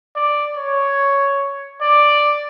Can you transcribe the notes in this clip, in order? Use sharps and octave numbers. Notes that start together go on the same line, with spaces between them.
D5
C#5
D5